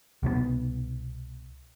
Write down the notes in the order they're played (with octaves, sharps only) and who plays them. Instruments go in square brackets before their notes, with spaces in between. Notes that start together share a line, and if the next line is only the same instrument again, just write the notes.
[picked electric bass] C2 B2 E3 B3